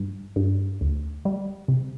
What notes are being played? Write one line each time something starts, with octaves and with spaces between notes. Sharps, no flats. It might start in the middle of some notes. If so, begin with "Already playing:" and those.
Already playing: G2
G2
D2
G3
C3